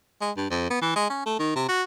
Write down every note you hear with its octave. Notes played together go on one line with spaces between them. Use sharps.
G#3
G2
F2
B3
E3
G#3
C#4
A3
D#3
C3
F#4